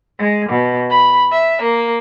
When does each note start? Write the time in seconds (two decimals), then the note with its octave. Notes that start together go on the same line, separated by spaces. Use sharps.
0.19 G#3
0.48 B2
0.91 B5
1.31 E5
1.62 A#3